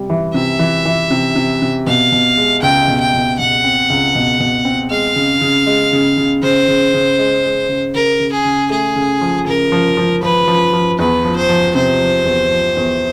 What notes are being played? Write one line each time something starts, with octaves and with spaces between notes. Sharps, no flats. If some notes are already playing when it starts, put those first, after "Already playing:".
Already playing: C3 G3
E3
C3 E5
E3
E3
C3
C3
C3
B2 F5
B2
G#3
C#2 G5
B2
G5
B2
B2 F#5
C4
C#2
B2
B2
C4
G#3 F5
C#3
C#3
G#3
C#3
C#3
C#3 C5
C#3
C#3
G#3
G#3
C#3
C#3 A#4
C#3
G#4
C#3
A3 G#4
C#3
F3
C#3 A#4
F3
F3
F3 B4
F3
F3
E2 B4
F3
C5
F3
C3 C5
F3
E2
F3
E2